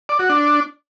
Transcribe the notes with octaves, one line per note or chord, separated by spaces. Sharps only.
D5
F#4
D4